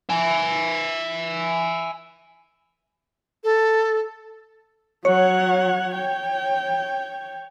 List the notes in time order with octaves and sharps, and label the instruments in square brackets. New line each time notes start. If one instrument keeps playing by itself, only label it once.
[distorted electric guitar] E5 G#5
[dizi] A4
[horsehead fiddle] F#3 F#5 [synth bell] C#5
[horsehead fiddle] G5